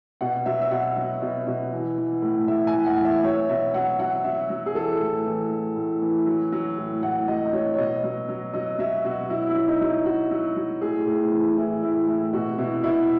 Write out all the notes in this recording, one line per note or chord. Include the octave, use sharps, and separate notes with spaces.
B2 F#5
F#3 E5
E5
B2 F#5
F#3
B2
B2
E3
E3
A2
A2 E5
G#5
A2
F#5
E3
E5
F#3 C#5
B2 E5
F#3 F#5
F#3 F#5
F#3 E5
F#3
G#4
E3 A4
A2
E3
E3
A2
E3
F#3
F#3
A2
A2 F#5
F#3 D#5
D#5
F#3 C#5
C#5
B2 D#5
F#3
F#3
F#3 D#5
F#3 E5
B2 F#4
F#3 E4
E4
F#3
D#4
F#3
E4
F#3 F#4
F#3
F#3
A2 G#4
A2
E3
E3 E4
A2 E4
A2 E4
B2 F#4
B2 E4
B2 E4